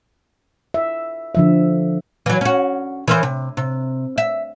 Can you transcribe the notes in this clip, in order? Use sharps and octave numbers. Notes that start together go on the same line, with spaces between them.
E5
D3 F3 E5
E3 F#3
C#4 F#4
E3 A#4 C5
C3
C3
E5